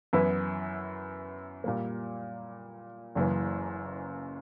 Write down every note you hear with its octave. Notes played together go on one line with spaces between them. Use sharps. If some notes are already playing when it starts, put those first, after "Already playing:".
F#2 E3 B3 E4 B4
A#2 G3 A#3
F#1 F#2 C#3 E3